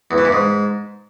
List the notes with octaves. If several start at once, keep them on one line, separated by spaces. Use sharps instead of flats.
E2
E3
G2
G#2